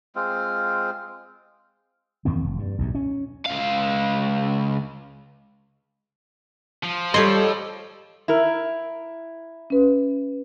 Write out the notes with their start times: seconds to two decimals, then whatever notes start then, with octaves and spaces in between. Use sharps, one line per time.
0.16 G#3 C4 F4
2.25 E2 D#3 A#3 C4
2.44 F1
2.59 G2
2.79 B1 E2 A2
2.95 C#4
3.46 C#2 F5
6.84 F3
7.14 G3 G4 A4 C#5 D#5 C6
8.28 E4 A#4
9.70 C#4 B4